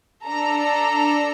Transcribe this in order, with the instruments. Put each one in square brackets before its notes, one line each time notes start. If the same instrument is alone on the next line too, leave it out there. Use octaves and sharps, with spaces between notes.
[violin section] D4 A4 A#5